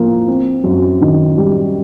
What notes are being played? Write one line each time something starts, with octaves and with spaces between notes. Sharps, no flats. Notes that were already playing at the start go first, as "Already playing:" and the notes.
Already playing: F3 A#3
C4
F#2
D#3
G3